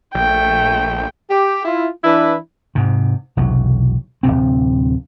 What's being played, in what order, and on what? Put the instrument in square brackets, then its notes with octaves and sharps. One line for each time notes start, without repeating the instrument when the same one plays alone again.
[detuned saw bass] A#1 [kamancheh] A3 G5
[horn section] G4
E4 F4
E3 D4 E4 B4
[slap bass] G#2 C3
E1 B1 C3 F#3
D1 A#1 C3 C4